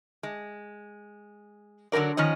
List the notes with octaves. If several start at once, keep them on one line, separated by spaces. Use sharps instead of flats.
G#3
D3 F#3 G#4 A#4 D5
D#3 F3 C#4 D#5